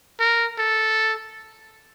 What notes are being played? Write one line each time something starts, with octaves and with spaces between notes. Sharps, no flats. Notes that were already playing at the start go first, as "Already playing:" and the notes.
A#4
A4